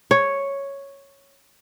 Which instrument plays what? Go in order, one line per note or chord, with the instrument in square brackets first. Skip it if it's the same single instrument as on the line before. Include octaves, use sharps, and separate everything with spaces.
[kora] C#5